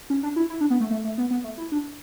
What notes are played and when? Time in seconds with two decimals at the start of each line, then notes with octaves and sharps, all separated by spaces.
0.10 C#4
0.23 D4
0.36 E4
0.50 E4
0.61 D4
0.70 B3
0.80 A3
0.91 A3
1.04 A3
1.18 B3
1.30 B3
1.44 A3
1.58 E4
1.72 D4